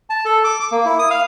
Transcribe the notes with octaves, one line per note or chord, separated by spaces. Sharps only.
A5
A4
D6
D6
A#3
E4
D#6
F5